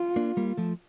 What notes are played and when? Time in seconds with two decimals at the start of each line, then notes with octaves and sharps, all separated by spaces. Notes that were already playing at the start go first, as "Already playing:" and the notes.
Already playing: F4
0.16 A#3 D4
0.37 G3 A#3
0.57 F3 A3